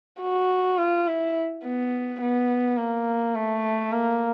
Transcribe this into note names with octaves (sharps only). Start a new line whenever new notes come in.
F#4
F4
E4
B3
B3
A#3
A3
A#3